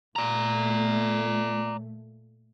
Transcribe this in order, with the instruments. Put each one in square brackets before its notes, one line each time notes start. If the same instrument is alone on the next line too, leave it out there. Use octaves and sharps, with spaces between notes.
[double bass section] A#2 A3 [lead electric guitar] D5 A#5